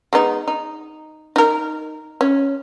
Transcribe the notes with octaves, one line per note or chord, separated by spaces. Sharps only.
G#3 B3 D#4
D#4
D#4 A#4
C#4